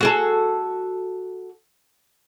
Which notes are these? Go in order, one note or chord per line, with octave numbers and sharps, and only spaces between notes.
F#4 G#4 A4